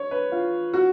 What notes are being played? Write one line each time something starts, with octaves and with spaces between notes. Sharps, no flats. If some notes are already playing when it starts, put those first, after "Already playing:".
Already playing: C#5
B4
F4
F#4